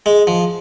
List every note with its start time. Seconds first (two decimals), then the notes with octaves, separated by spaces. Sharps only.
0.06 G#3
0.27 F3